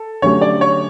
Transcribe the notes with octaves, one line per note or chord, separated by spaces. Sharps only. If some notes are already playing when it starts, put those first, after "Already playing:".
Already playing: A4
D3 F#3 A3 C#4 G4 C#5
D5
C#5